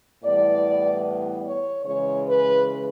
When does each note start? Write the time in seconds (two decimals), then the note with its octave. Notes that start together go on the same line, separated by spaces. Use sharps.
0.23 A2 E3 G3 B3 D5
1.45 C#5
1.85 C#3 E3 G#3 C#5
2.26 B4